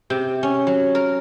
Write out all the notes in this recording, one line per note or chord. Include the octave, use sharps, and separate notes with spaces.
C3
C#4
F#3
A#4